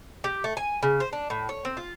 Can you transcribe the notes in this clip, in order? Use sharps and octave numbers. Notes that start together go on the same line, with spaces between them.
G4
A3
G#5
C#3
C5
D4
A2
C#5
C4
F4